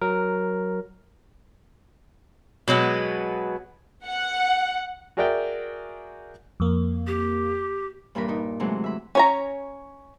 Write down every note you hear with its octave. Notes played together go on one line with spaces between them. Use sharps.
F#3 A#4
B2 F#3 G#3 B3
F#5
F#4 G#4 A#4 D5 E5 G5
F2 A#3
G4
G2 A#2 E3 D4 A#4 B5
D#4 A#4
C3 E3 F#3 G#3 A3
E5 B5
C#4 C#5 A#5